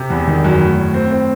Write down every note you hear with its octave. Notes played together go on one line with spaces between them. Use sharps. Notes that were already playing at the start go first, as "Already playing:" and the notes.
Already playing: C3
E2
D#3
F#2
A2
A2
C4
C4